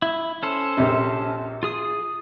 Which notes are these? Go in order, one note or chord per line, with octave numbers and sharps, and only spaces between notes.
E4
C#4 A4 C5
A#1 C3
F4 G#4 D#6